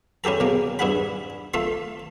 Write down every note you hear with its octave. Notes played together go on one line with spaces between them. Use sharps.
C#4 E4 G4 A4 A#5
B2 G#3 A#3
G2 E4 G#4 F#5 B5
A3 F4 E5 C6